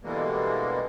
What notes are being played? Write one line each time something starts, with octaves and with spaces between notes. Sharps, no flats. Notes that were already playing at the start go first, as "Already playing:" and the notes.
B2 D3 E3 G3 G#3 A#3